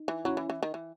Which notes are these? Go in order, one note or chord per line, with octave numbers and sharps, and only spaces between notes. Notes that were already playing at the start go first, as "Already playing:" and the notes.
Already playing: D#4
E3
F#3 C#4 E4
E3
E3
D#3
E3